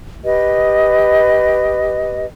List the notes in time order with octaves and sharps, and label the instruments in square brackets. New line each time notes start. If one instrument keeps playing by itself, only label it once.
[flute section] G4 B4 D#5